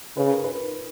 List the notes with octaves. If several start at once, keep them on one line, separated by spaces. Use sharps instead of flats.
C#3 B4
A#4
B4